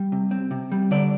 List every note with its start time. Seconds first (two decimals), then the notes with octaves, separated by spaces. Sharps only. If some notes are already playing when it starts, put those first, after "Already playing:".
Already playing: G3
0.12 C3
0.31 C4
0.51 C3
0.72 G3
0.91 D3 D5